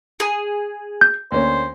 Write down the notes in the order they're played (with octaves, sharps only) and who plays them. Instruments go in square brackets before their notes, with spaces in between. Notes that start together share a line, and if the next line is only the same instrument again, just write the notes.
[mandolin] G#4
[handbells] G6
[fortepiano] D2 A#3 C#4 [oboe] C5